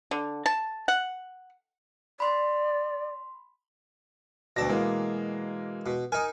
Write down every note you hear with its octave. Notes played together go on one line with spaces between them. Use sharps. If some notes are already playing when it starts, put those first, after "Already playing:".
D3
A5
F#5
D5 B5 C6
D2 B2 D5 A5 A#6
E3 G#3 A#3
B2
D#4 A#4 G#5